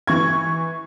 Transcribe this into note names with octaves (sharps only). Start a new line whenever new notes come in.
E3 C#6 G#6